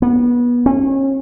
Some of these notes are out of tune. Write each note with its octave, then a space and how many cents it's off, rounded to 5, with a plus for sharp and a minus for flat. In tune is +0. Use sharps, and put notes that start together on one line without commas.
B3 -25
C#4 -35